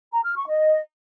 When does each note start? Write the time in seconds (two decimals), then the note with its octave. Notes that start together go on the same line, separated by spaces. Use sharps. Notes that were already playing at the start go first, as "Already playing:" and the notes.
0.12 A#5
0.24 F6
0.36 C#6
0.48 D#5